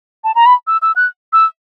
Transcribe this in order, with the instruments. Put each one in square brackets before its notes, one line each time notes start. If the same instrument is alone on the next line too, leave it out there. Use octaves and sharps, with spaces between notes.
[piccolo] A5
A#5
B5
E6
E6
F#6
E6